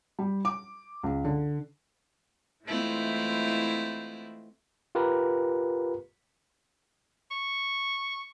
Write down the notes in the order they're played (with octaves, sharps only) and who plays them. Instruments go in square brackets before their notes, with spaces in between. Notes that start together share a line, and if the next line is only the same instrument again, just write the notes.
[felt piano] G3
D6
C#2
D3
[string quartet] E3 G#3 A3 C4 E4 F4
[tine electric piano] F4 G4 A#4 B4
[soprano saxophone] C#6